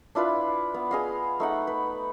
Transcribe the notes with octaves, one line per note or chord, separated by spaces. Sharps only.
D4 E4 F4 B4
B3
G#4 D#5 F5
A3 D#4 F#5
B4